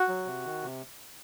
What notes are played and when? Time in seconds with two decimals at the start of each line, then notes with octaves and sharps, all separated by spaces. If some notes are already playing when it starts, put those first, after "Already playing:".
Already playing: F#4
0.08 F#3
0.26 C3
0.45 D#3
0.63 C3